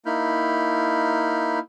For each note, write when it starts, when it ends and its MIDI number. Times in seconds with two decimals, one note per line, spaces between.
0.06 1.59 58
0.06 1.59 63
0.06 1.59 64
0.06 1.59 83
0.06 1.59 89
0.06 1.59 91